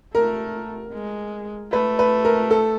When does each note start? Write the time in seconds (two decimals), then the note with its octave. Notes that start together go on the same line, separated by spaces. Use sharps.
0.14 A3 A#4
0.94 G#3
1.72 A3 B4
1.99 B4
2.25 A#4
2.51 A4